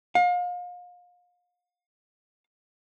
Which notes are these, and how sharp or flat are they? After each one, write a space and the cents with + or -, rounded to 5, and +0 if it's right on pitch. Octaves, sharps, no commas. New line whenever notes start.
F5 +35